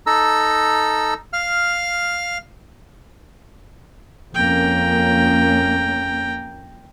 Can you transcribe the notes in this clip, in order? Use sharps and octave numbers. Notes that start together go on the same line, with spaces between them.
D#4 A4 A#5 E6
F5 F6
F2 A#3 C#4 G5 A#5